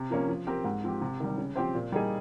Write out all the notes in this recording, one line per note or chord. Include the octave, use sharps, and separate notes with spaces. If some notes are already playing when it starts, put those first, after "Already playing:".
Already playing: C3
F3 A#3 C#4
F3
C4 G4 A#4
G#2
F3 C4 G4
C3
D#3 G3
C#3
F3 C4 G4 C5
A#2
G3 A#3 D#4 G#4